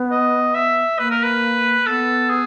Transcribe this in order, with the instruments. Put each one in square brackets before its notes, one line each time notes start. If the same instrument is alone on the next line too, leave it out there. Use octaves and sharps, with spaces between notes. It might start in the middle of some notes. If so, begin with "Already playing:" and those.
Already playing: [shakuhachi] B3
[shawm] D#5
E5
[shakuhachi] A#3 [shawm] B4
[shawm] A#4
B4
[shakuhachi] B3 [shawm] A4
[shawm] G#4